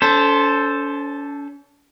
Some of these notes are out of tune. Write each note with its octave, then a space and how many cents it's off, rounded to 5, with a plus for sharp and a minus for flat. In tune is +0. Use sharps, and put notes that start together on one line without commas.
C#4 +40 A4 +0 C5 +0